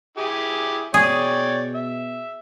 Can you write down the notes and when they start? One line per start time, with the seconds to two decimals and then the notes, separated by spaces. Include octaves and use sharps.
0.17 E4 G4 G#4
0.94 B2 G#4 C#5 D5 G5
1.74 E5